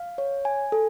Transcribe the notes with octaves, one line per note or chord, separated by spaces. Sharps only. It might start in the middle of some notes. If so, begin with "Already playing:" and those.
Already playing: F5
C#5
G#5
A4